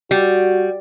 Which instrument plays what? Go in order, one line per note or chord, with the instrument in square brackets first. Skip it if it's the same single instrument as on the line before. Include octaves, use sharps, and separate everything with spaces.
[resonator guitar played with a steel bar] G3 [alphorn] F#4